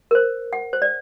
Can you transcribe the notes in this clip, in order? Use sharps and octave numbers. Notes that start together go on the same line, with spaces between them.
A#4
C5
F#5
C5
D5